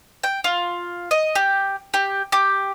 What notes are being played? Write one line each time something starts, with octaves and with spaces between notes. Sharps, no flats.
G5
F4
D#5
G4
G4
G4